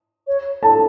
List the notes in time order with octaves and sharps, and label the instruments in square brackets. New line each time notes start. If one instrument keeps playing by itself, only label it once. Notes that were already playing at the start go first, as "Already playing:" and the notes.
[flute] C#5
[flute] A4 [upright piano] A5